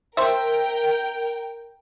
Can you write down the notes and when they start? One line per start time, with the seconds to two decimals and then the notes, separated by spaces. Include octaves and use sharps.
0.17 A#4 C5 E5 G5